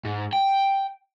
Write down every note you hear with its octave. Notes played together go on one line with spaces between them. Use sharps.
G#2
G5